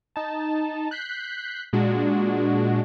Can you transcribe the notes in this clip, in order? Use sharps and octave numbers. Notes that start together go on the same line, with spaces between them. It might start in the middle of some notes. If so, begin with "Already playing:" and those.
D#4 A5
F#6 G6 B6 C7
A#2 G#3 D4 F#4